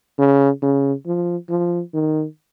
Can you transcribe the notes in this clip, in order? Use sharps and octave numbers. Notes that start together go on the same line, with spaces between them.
C#3
C#3
F3
F3
D#3